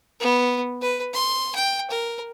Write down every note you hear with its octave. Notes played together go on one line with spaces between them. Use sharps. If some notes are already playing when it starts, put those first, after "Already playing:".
B3
B4
C6
G5
A#4